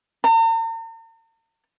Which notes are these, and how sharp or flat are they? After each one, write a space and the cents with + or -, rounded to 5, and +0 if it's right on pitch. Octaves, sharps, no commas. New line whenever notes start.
A#5 -45